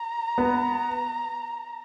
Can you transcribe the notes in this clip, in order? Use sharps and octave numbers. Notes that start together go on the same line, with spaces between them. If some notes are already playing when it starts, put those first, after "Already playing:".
Already playing: A#5
B3